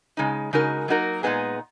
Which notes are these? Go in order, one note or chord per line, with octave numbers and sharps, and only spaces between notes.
C#3 G#3 D#4
C#3 G#3 D#4 F#4 A#4
F#3 A#3 D#4 F#4 A#4
A#2 G#3 B3 D#4 G#4